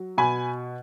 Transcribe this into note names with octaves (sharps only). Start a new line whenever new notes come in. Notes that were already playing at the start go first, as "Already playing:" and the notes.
Already playing: F#3
B2 G#5 B5